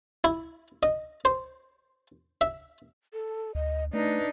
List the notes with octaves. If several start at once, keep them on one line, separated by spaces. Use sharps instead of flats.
E4
D#5
C5
E5
A4
D2 D#5
A3 D4 D#4 B4